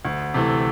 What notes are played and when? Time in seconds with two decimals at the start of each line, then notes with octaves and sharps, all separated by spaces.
0.05 D2
0.34 C3 E3 A3